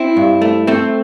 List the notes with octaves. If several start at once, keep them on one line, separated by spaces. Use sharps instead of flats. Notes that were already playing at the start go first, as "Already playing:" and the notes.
Already playing: C4 E4
G2
A3
A3 C4